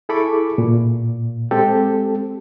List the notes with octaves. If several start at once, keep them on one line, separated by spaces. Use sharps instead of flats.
E4 G#4 A4 B5 C#6 D6
A#2
G#3 C4 G4 A4